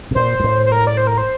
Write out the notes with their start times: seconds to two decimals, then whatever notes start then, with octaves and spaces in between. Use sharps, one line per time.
0.11 C3
0.15 A#2 C5
0.40 G2
0.44 A2
0.66 C5
0.72 A#4
0.87 D5
0.97 C5
1.07 A#4
1.18 C5